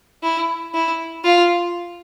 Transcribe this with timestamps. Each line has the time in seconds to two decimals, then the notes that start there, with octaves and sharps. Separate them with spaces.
0.23 E4
0.74 E4
1.25 F4